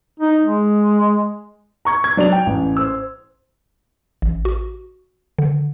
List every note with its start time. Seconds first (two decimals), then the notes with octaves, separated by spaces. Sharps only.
0.20 D#4
0.42 G#3
1.85 A#5 C#6 G#6
2.04 G#6
2.17 F#3 D4 D5 F7
2.32 G5
2.46 A1
2.77 C5 E6
4.22 A1
4.45 F#4
5.39 D3